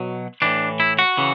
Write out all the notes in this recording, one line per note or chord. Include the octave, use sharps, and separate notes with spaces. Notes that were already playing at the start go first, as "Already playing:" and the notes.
Already playing: B2 F#3
A2 E3 D4
E4
F#4
C#3 E3